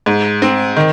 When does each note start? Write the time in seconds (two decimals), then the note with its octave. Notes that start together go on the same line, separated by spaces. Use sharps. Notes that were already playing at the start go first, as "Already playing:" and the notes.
0.06 G#2
0.42 C4
0.76 D#3